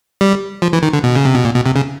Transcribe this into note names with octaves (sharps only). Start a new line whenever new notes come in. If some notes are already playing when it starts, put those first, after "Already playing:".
G3
F3
E3
D#3
D3
B2
C#3
C3
B2
A#2
B2
C3
C#3